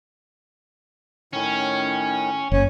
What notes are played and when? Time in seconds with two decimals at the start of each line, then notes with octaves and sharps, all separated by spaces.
1.33 A2 D#3 C#4
2.52 F#1 C#4